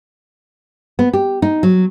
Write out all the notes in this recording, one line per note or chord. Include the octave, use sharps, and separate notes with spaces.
B3
G4
D#4
F#3